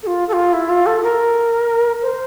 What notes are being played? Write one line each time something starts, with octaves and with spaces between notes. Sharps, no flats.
A4
F4
A4
F4
E4
F4
A4
A#4
C5